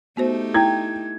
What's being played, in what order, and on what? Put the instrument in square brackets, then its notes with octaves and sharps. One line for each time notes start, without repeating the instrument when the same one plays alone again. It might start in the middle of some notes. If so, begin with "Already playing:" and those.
[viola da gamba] A3 D#4 G4 [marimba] B3 F#4 C5
[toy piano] E4 [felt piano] G5 G#6